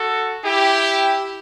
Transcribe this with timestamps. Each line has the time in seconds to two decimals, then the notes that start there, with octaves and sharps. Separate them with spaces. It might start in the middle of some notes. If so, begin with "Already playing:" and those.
Already playing: F#4 A4
0.44 E4 G4